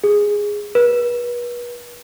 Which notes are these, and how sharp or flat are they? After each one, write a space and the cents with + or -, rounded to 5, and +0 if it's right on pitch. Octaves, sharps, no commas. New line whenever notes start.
G#4 -10
B4 -40